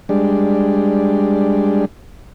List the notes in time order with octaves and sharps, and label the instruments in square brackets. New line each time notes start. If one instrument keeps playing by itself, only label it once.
[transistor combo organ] G3 G#3 D4